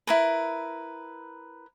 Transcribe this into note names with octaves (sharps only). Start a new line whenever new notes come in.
E4 A#4 B4